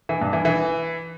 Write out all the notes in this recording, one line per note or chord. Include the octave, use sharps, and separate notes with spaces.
E3
G2
E3
E3